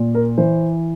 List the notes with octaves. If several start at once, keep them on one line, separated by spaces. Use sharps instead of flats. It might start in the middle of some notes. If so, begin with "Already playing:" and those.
Already playing: A#2
A#4
E3 C5